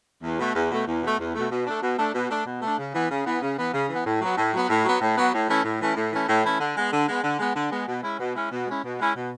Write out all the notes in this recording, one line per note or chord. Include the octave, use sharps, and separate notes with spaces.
E2
B2 A3
E2
B2 A3
E2
B2 A3
E2
B2 A3
B2
A3 D4
B2
A3 D4
B2
A3 D4
B2
A3 D4
C#3
E3 B3
C#3
E3 B3
C#3
E3 B3
C#3
E3 B3
A2
F#3 B3
A2
F#3 B3
A2
F#3 B3
A2
F#3 B3
A2
E3 A3 C#4 E4
A2
E3 A3 C#4 E4
A2
E3 A3 C#4 E4
A2
E3 A3 C#4 E4
D3
G#3 B3
D3
G#3 B3
D3
G#3 B3
D3
G#3 B3
B2
G#3 C#4 E4
B2
G#3 C#4 E4
B2
G#3 C#4 E4
B2
G#3 C#4 E4
B2